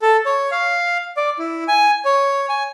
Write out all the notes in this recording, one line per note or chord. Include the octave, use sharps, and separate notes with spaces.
A4
C#5
F5
D5
E4
G#5
C#5
G#5